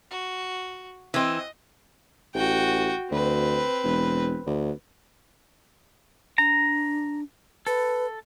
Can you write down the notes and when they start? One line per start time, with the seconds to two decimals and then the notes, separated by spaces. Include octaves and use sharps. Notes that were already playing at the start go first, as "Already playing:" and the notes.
0.11 F#4
1.14 E3 C4 D#5
2.35 A1 F#4 G5
3.11 D2 C4 B4
3.84 E1
4.46 D2
6.38 D4 A#5
7.67 A4 B4